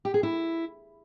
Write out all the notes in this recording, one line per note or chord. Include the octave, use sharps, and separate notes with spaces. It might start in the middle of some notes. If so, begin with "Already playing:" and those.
G4
G#4
E4